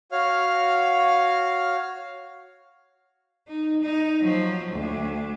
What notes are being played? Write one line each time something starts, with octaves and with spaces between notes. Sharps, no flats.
F#4 C#5 F5 F6
D#4
D#4
F3 F#3
D2 D4